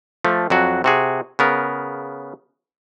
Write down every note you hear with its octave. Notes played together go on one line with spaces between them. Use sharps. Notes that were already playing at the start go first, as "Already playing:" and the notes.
F3 A3
F2 F#3 F#4
C3 F#4 G#4
C#3 B3 A#4